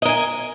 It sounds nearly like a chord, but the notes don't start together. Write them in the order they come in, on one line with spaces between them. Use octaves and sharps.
D#5 A#4 G#5